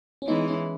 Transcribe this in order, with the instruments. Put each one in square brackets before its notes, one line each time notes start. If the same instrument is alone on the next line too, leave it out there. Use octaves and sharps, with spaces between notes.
[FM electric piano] C#4
[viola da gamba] E3 G#3 [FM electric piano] B3 D#4
[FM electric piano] C#4 E4